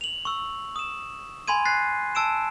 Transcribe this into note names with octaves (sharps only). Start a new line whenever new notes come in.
F7 F#7
C#6 E6
D#6 E7
G#5 B5 C6 G#6 D#7
F#6 A6 B6 C7
A5 E6 D7 E7